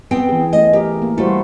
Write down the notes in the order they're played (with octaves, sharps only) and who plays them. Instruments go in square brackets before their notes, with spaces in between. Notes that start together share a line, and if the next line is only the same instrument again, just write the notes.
[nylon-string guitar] B3 C4 G5
[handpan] E3 G#4
[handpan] A3 C#4 [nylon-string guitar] D#5
[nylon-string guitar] G4 [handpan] A#4
[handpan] A#3
[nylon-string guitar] G3 A3 [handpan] E4 F#4 C5